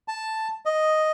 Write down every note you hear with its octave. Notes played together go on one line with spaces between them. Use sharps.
A5
D#5